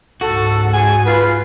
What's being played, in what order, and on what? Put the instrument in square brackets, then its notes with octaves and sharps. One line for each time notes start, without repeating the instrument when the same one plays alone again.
[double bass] C#2 G#2 [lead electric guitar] F#4 [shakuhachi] A4
[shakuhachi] G#4 [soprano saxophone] G#5
[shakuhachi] F4 [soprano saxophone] B4